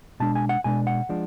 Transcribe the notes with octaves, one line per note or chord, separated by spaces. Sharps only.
B2 G#3 D4 A5
G#5
F#5
B2 G#3 D4 G#5
F#5
F3 G#3 D4